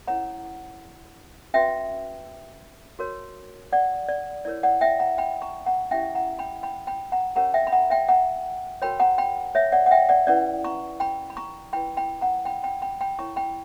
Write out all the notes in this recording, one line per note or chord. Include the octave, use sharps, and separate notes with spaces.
C#4 E4 A#4 C#5 F#5 A#5
C#4 F#4 B4 E5 G5
F#4 A#4 C#5
D5 F#5
D5
E4 A#4 C#5 D5
D5 F#5
E5 G5
F#5 A#5
G5 B5
A#5 C#6
F#5 A#5
C#4 E4 G4 E5 G5
F#5 A#5
G5 B5
G5 B5
G5 B5
F#5 A#5
C#4 G4 A#4 C#5 F#5 A#5
E5 G5
B5
F#5 A#5
E5 G5
F#5 A#5
F#4 A#4 C#5 G5 B5
F#5 A#5
G5 B5
C#5 E5
D5 F#5
F#5
E5 G5
D5 F#5
C#4 E4 B4 D5 F#5
A#5 C#6
G5 B5
B5
A#5 C#6
E4 B4 G5 B5
G5 B5
F#5 A#5
G5 B5
G5 B5
G5 B5
G5 B5
E4 A#4 C#5 A#5 C#6
G5 B5